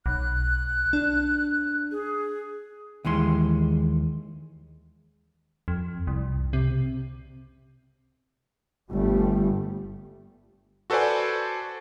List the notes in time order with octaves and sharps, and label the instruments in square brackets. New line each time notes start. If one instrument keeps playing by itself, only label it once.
[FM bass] B1 [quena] F#6
[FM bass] D4
[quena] G#4
[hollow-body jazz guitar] D#2 E3 G#3 C6
[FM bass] F2
C2
C3
[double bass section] G1 G3 A3
[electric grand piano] F#4 A4 B4 C5 D5 G#5